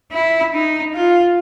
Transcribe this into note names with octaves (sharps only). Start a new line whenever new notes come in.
E4
D#4
F4